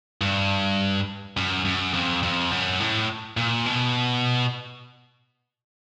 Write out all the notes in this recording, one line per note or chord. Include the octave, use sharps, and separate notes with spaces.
G2
F#2
F#2
F2
F2
F#2
A2
A#2
B2